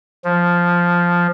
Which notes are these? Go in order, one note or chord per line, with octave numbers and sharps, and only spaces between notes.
F3